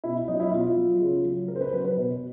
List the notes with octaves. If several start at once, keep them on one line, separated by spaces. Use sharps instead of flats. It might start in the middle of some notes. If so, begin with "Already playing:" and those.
B2 E4
F#3 D#4
E4
B2 F4
F#3
C#3
F#3
C#3 A#4
C5
B4
F#3 B4
B4
B2